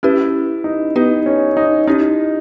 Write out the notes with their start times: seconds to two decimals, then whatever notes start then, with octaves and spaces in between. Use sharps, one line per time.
0.03 C#4 E4 G4 B4
0.64 D#4
0.96 B3 D#4 G4 B4
1.26 C#4
1.57 D#4
1.87 C#4 D#4 E4 G4